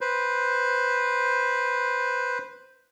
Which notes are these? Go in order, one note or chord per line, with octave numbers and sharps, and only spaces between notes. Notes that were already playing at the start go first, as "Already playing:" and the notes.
B4 C5